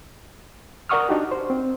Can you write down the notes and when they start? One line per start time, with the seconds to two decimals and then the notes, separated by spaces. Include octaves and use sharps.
0.89 A#4 D5 F#5 C#6 D#6 F6
1.09 D4 D#4 F#4 G4
1.31 C5
1.50 C4